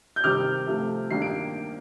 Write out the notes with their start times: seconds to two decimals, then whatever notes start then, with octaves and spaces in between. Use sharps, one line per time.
0.16 G6
0.24 C3 D#3 G3 D6 F6
0.67 C3 F3 A3
1.10 D#3 G3 A#3 D4 C7
1.22 D7